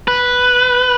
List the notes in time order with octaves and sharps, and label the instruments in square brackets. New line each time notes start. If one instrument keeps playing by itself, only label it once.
[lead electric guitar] B4